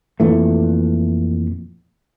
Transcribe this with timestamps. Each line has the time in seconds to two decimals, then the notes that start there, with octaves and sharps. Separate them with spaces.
0.20 F2 A#2 E3 A3